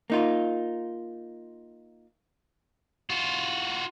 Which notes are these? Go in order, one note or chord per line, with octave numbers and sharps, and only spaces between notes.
A#3 D#4 F4
F4 F#4